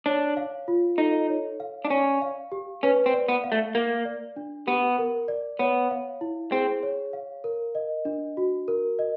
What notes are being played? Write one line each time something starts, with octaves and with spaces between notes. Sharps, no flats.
D4 C#5
F5
F4
D#4 A4
C#5
F5
D4
C#4 D5
F5
G4
C#4 B4
C4
D5
B3
F5
A3
A#3 A#4
D5
D4
B3 G4
A#4
D5
B3 C#5
F5
E4
C4 G#4
C#5
F5
A#4
D#5
D4
F#4
A#4
D#5